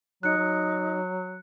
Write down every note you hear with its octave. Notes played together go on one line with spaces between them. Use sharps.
F#3 D#4 F#6 C#7
F#3